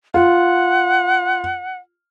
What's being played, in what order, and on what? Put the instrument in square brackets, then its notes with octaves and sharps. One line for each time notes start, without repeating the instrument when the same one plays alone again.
[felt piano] F4 [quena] F#5